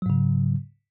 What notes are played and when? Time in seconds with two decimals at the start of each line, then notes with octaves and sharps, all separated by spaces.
0.02 F#3
0.06 G#2
0.10 C#3